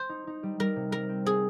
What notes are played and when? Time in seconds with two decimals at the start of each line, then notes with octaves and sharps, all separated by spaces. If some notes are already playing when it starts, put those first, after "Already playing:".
Already playing: C5
0.09 D#4
0.27 D#4
0.43 G3
0.60 G3 A#4
0.76 C3
0.92 G3 A#4
1.09 C4
1.25 C4 G#4